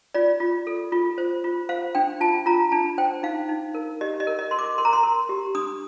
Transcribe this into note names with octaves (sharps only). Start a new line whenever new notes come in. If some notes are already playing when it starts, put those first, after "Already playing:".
F4 D5
F4
A4
F4
C5
F4
C5 F5
D4 G5
F4 A5
F4 A#5
D4 A5
C5 G5
D#4 F5
D#4
A#4
G4 D#5
D#5
A#4
D#5
A#4 C6
D6
A#4 C6
A#5
C6
A#4
G4
D4 D#6